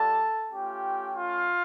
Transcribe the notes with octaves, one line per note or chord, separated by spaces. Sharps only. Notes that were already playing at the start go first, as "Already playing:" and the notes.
Already playing: G3 D4 F4 A4 A5
A3 C#4 F4 G4 G5
F4 F5